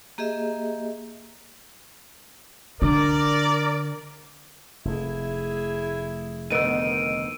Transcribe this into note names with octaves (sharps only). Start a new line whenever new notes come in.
A#3 G4 G#4 D#5 E5
D3 A#4 D5
F1 A3 E4 G#4
D2 D#3 B3 E6 D7 D#7